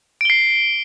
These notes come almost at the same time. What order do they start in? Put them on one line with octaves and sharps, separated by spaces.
D7 G7 C7